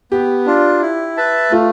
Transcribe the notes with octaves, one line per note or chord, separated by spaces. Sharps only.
B3 G4
D4 F4
E4
B4 E5 A5
A3 F4